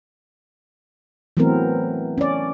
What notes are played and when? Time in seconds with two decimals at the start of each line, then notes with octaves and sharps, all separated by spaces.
1.37 E3 F#3 A3 B3 C4 A#4
2.18 C#4 D5